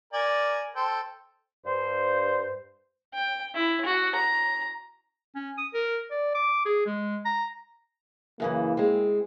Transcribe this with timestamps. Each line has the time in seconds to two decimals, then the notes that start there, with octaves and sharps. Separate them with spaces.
0.13 A#4 D5 G#5
0.75 A4 C5 G5
1.65 G2 C5
3.14 G5
3.55 E4
3.85 F#4
4.15 A#5
5.35 C#4
5.58 D#6
5.74 A#4
6.11 D5
6.35 D6
6.65 G#4
6.86 G#3
7.25 A#5
8.40 F#2 C#3 E3 A#3
8.77 G#3 C4